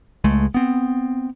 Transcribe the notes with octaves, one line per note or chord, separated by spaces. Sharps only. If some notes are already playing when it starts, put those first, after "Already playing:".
C#2 G#3 A3
B3 C4